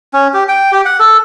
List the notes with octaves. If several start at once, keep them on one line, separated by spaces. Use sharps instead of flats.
C#4
G4
G5
G4
F#5
A4